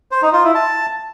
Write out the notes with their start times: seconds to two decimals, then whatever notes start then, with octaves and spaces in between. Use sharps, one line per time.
0.11 C5
0.22 D#4
0.33 F4
0.44 E4
0.55 A5